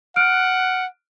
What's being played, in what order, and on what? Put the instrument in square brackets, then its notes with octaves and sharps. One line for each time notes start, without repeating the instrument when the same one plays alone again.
[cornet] F#5 [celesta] F6 F#6 D7